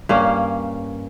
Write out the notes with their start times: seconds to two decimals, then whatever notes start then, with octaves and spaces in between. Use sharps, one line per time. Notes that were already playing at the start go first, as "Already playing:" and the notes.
0.09 G2 A#3 C#4 F5